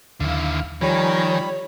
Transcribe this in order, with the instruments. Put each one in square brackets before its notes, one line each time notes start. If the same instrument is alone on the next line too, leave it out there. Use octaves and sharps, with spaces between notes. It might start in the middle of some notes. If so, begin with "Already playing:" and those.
[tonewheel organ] D#2 F5 [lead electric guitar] D3 E4
[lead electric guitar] D#3 [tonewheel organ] F3 G#5 A#5 [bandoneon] G3 B5 [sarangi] C#5